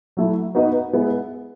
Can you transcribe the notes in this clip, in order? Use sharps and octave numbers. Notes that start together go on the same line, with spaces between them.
F#3 A3 E4
B3 D#4 F#4 B4 D#5
G#3 B3 E4